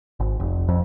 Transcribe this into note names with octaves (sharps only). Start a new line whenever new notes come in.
G#1
F1
F2